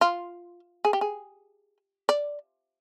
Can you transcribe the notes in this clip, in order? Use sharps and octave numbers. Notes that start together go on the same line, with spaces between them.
F4
G#4
G4
G#4
D5